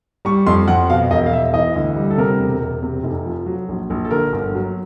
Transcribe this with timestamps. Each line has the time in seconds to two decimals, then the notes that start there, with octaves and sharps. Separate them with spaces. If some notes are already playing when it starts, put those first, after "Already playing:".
0.25 G3 C#6
0.47 F2 C6
0.68 F2 F#5
0.90 B2 F5
1.11 E1 D#5
1.26 F5
1.33 E1 E5
1.54 E3 D#5
1.76 D2
1.96 G3
2.10 A4
2.18 C3 A#4
2.39 E1
2.61 E1
2.83 C3
3.03 F1
3.26 F3
3.46 F#3
3.69 A#1
3.90 A#1
4.05 A4
4.11 D3 A#4
4.33 G1
4.55 F#3